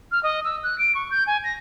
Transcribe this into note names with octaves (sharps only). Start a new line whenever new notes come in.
F6
D#5
E6
F#6
D7
C#6
G6
G#5
A#6